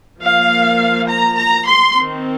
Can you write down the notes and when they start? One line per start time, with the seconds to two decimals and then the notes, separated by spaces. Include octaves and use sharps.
0.20 F3 A#3 F5
1.07 A#5
1.37 A#5
1.66 C6
1.95 D#3 C4